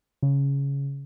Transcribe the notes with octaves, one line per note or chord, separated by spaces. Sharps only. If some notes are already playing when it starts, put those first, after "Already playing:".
C#3